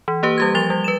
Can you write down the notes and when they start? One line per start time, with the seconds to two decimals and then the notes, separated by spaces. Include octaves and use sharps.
0.08 E3
0.23 A#3 G4 B4
0.38 G3 G4 G#6
0.55 F3 A6 F7 G7
0.70 G3
0.84 B4 E7